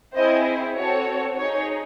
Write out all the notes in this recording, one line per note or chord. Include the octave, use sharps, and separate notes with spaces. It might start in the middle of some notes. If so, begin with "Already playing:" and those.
C4 E4 G#4 C5 D#5
C5
C4 F#4 A4 C#5
D#4 G#4 C#5